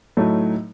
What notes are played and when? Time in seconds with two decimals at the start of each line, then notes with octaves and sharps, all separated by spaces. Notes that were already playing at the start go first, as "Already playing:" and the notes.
0.17 A2 F#3 A3 D#4